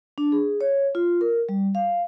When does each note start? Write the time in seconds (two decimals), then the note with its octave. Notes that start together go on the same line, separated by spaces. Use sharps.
0.18 D4
0.32 G#4
0.61 C#5
0.95 F4
1.21 A#4
1.49 G3
1.75 F5